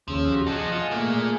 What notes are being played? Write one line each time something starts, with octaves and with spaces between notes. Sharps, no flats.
D#2 C#3 F3 E6
F#4 G4
E2 F3 G#4 D#5 F#5 A5
F4
A#2 A3 A#3